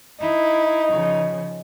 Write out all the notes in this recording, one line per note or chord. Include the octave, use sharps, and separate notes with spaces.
D#4 E4
C#3 F3